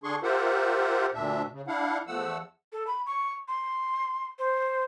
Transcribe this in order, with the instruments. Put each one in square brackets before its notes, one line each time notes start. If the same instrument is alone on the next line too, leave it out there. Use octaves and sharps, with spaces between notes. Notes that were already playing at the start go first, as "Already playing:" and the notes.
[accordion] D3 D4 G#4 C6 C#6
F4 G4 A#4 C5 E5 F#5
D2 A#2 D4 E5
C#3
D4 E4 F5 F#5
E2 F3 A3 F#5 E6
[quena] A4
B5
C#6
C6
C5